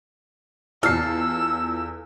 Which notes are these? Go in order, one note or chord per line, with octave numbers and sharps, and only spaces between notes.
E2 F4 A4 E6 F6 C7